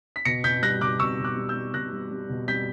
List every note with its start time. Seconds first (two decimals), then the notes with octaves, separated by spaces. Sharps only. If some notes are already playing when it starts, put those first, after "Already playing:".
0.16 B6
0.25 B2 A#6 C#7
0.44 B2 G6 B6
0.62 G3 F#6 A#6
0.81 B2 D6 F#6
0.99 B2 C#6 E6
1.18 B2
1.24 D6 F#6
1.37 G3
1.49 E6 G6
1.55 G3
1.74 B2 F#6 A#6
1.92 G3
2.11 G3
2.30 B2
2.48 G3 G6 B6